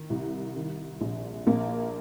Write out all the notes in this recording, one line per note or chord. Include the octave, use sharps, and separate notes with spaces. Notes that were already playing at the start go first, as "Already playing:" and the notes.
Already playing: D#3
C2
D#3
A#1
A#1 A#3